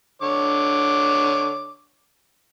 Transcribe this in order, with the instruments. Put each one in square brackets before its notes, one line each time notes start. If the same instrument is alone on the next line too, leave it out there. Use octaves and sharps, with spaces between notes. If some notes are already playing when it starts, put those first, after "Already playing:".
[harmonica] D3 C#5 D6